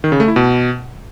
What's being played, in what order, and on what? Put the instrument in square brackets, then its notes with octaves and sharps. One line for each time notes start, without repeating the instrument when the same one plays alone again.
[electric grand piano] D#3
C#3
A3
E4
B2